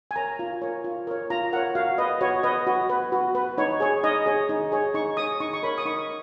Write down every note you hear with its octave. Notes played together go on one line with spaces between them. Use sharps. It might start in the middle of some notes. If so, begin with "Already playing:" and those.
G#5
A#4 C#5 A#5
F4
A#4 C#5
F4
A#4 C#5
F4 A#5
A#4 C#5 F#5
F#4 F5
B4 D#5
F#4 C#5
B4 D#5
F#4
B4
F#4
B4
D#4 C#5
G#4 C#5
D#4 D#5
G#4 C#5
D#4
G#4 C#5
D#4 C#6
G#4 C#5 D#6
D#4 C#6
C#6
A#4 C#5 B5
D#6
D#4 C#6